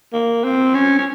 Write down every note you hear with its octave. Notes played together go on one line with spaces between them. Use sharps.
A#3
C4
C#4
C#4